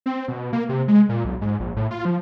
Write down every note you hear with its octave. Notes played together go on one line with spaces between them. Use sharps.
C4
B2
A#3
C3
G#3
A#2
B1
G#2
A#1
A2
F4
F3